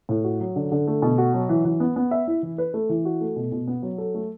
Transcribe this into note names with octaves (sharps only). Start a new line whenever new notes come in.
A2
F#4
F#3
D3
D3
A3
B2
F#4
F#3
E3
E3
B3
B3
E5
E4
E3
B4
A3
E3
F#4
A3
B2
B2
B3
F#3
A4
A3